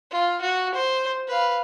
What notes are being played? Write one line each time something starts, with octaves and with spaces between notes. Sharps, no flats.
F4
F#4
C5
B4 F5